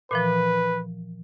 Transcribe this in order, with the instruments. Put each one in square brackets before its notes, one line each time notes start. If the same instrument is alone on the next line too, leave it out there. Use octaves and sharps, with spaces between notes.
[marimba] A#2 E3 F3 [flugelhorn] B4